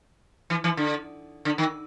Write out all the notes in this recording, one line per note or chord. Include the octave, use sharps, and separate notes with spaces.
E3
E3
D3
D3
D#3